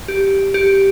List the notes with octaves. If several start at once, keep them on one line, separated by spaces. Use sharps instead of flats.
G4
G4